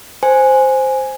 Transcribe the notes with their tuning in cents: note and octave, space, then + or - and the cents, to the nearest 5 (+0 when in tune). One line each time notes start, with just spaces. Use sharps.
C5 +0 G#5 +0